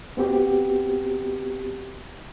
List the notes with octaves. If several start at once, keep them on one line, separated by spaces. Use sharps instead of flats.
B3 C4 F#4 G4